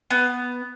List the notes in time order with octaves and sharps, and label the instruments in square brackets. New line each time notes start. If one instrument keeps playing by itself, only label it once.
[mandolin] B3